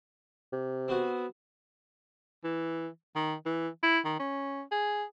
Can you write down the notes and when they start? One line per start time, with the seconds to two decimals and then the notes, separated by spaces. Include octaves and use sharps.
0.52 C3
0.88 B3 C4 F#4
2.44 E3
3.16 D#3
3.46 E3
3.83 E4
4.05 D#3
4.20 C#4
4.72 G#4